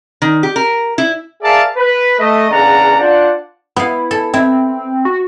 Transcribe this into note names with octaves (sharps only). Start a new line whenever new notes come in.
D#3
G4
A#4
E4
G#4 A#4 D5 E5 F5 A5
B4
A3 D#5
E2 C#3 A#3 D4 F#5 A#5
D4 F4 C5 D5 F#5
B3 E4 F5
A4
C4 E4
F#4